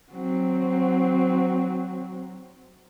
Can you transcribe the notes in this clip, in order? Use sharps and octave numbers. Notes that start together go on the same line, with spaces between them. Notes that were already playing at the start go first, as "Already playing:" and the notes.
F#3 C4